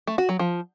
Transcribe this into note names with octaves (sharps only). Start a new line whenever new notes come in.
A3
F#4
F#3
F3